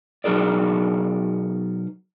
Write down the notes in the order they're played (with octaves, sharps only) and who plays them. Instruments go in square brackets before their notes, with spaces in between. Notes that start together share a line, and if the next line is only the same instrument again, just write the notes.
[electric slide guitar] B2 F#3 D#4 G#4 A#4 D5